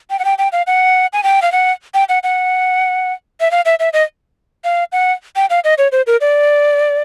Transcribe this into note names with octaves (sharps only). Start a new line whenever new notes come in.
G5
F#5
G5
G5
F5
F#5
G#5
G5
F5
F#5
G5
F#5
F#5
E5
F5
E5
E5
D#5
F5
F#5
G5
F5
D#5
C#5
C5
A#4
D5